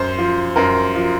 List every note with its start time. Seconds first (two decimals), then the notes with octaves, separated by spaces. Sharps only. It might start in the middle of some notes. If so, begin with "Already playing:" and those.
Already playing: F#2 C5
0.18 F3
0.56 F#2 A#4
0.95 F3